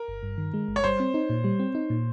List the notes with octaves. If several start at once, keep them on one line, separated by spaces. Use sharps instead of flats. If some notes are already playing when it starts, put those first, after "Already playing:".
Already playing: A#4
G1
G2
D#3
G#3
G1
C#5
G3 C5
C4
D#4
A#2
G3
C4
D#4
A#2